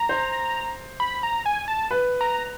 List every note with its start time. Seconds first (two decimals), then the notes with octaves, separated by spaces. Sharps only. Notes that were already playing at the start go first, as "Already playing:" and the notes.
Already playing: A#5
0.09 C5
1.00 B5
1.23 A#5
1.46 G#5
1.68 A5
1.91 B4
2.21 A#5